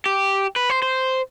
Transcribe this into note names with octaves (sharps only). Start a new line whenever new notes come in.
G4
B4
C5
C5